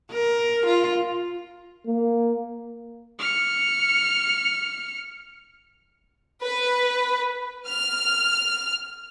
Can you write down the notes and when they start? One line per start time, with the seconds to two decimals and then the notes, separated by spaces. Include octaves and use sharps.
0.11 A#4
0.66 F4
1.86 A#3
3.19 F6 C#7
6.41 B4
7.66 F6